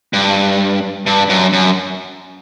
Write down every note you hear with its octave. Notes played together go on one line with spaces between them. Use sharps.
G2
G2
F#2
F#2